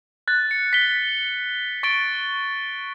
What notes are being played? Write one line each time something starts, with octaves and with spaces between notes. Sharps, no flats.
F#6 A6
C#7
B6 G7
C#6 A6 D7 G7